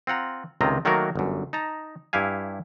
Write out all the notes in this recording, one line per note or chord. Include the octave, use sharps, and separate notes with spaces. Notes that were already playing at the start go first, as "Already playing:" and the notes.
C4 F4 F#5 A#5
C#2 C3 D#3 C4 D#5 A#5
D#3 F#3 A3 A#3 F#4 A#4
G1 F#2
D#4 A5 A#5
G2 E4 G4 F5 G#5